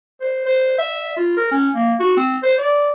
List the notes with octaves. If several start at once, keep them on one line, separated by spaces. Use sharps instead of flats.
C5
C5
E5
F4
A#4
C#4
A#3
F#4
C4
C5
D5